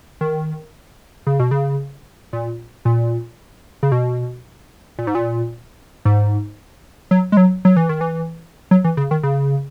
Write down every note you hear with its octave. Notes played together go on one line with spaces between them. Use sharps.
D#3
C#3
B2
C#3
A#2
A#2
C#3
B2
A#2
G#2
A#2
G#2
F#3
G#3
F#3
F#3
E3
D#3
E3
F#3
E3
C#3
D#3
C#3